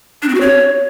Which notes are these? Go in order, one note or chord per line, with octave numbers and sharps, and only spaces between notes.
D4
C4
F#4
C#5